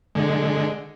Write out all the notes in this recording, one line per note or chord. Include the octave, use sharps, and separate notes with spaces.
D3 G#3